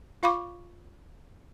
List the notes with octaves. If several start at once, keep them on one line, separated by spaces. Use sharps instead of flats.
F4 F5 B5 C#6 D6